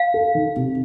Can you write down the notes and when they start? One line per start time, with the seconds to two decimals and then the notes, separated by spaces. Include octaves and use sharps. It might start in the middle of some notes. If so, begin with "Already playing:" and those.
Already playing: F5
0.14 A4
0.35 D#3
0.56 C3